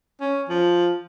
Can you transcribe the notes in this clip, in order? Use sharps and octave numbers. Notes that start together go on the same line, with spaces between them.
C#4
F3